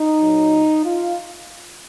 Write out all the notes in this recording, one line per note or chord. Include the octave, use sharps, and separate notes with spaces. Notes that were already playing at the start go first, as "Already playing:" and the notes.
Already playing: D#4
A#2 F#3
F4